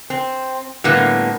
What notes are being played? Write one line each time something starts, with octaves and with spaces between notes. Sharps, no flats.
C4
A2 D3 G3 A#3 B3